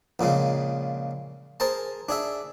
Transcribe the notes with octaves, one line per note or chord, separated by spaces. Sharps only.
A#1 A#2 C#3 G#3
G#4 A#4 C5 A5
D4 G#4 E5